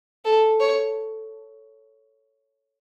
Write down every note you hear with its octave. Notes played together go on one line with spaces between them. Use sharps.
A4
C#5